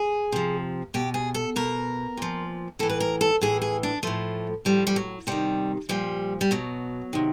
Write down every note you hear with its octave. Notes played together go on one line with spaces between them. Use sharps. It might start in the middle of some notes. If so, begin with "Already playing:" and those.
Already playing: G#4
C3 F3
B2 G4
G#4
A4
B2 A#4
A#2 F3
A2 E3 A4
B4
A#4
A4
A2 E3 G#4
G#4
D4
A2 F3 A3
A2 F3 G3
G3
F#3
C3 D#3 G3
A#2 F3 G3
G3
B2 F#3
C3 D#3